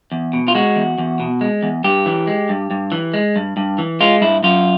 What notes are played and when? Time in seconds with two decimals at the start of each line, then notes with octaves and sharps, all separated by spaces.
0.12 E2
0.33 B2
0.48 F4
0.55 G#3 F#4
0.76 E2
0.98 E2
1.20 B2
1.41 G#3
1.63 E2
1.84 G2 G4
2.06 E3
2.27 G#3
2.49 G2
2.71 G2
2.92 E3
3.14 G#3
3.36 G2
3.57 G2
3.78 E3
4.01 G#3 F4
4.21 G2 E4
4.43 F#2 F4